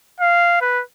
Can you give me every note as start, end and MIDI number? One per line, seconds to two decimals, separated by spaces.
0.20 0.61 77
0.61 0.83 71